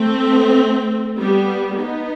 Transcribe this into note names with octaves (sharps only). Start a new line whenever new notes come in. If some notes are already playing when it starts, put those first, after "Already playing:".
Already playing: A3 C4
G3 B3
B3 D#4